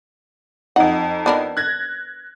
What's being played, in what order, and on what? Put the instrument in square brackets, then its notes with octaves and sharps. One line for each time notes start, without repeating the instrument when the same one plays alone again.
[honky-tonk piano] F2 D#4 [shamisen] F#5
[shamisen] B3 D4 A#4
[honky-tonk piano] F#6 G#6 A#6